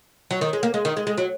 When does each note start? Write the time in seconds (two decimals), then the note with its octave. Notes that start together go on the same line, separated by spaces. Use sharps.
0.31 F#3
0.41 D#3
0.53 G#3
0.63 A#3
0.74 G#3
0.85 D#3
0.97 G#3
1.07 G#3
1.18 F#3